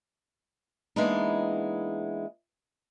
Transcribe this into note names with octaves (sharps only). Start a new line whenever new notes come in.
E3 G#3 A#3 B3 D4 D#4